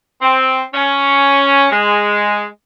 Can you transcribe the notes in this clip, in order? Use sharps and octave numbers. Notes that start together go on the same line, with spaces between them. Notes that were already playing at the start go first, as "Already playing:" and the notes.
C4
C#4
G#3